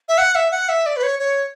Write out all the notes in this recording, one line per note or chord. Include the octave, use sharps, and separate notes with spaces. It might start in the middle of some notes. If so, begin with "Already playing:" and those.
E5
F#5
E5
F#5
E5
D5
B4
C#5
C#5